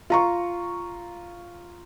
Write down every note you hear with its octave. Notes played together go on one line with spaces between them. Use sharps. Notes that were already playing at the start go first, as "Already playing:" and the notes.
F4 A#5 C#6